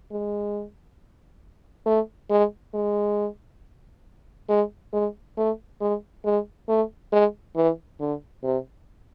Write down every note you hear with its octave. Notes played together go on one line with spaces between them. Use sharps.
G#3
A3
G#3
G#3
G#3
G#3
A3
G#3
G#3
A3
G#3
E3
D3
C3